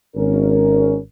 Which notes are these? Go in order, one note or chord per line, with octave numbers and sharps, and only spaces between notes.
G#1 C#4 A#4